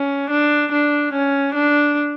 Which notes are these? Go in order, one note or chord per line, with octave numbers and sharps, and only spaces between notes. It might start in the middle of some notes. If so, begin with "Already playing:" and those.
Already playing: C#4
D4
D4
C#4
D4